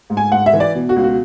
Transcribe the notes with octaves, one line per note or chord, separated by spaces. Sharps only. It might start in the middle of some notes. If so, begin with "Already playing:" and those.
G#2
G#5
G#2 F#5
E5
E3
D5
B2
F#4
C#2
F#4